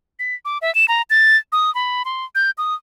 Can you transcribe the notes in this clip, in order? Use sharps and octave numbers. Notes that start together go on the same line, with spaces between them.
B6
D6
E5
E7
A#5
A6
D#6
B5
C6
G6
D#6